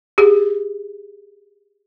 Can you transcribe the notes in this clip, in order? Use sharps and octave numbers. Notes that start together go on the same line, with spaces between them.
G4 G#4